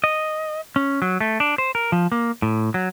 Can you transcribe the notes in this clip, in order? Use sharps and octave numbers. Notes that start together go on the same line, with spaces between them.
D#5
C#4
F#3
A3
D4
C5
A#4
F3
A#3
A2
F#3